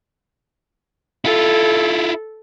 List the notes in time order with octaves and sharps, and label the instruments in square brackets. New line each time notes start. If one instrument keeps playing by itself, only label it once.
[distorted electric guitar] E4 F4 [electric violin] A4